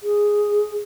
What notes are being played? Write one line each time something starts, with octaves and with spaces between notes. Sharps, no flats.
G#4